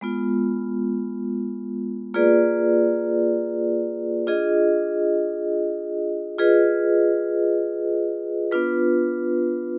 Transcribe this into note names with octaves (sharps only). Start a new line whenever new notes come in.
G#3 B3 F4
A#3 F4 G#4 B4 D5
D4 F4 G#4 D#5
F4 G#4 B4 D#5
B3 D4 F4 B4